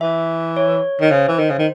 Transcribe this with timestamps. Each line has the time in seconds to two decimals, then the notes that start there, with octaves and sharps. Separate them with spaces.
0.01 E3 E5
0.57 C#5
1.01 D#3
1.11 C#3 C5
1.28 E3
1.39 D#3
1.50 C#3
1.59 D#3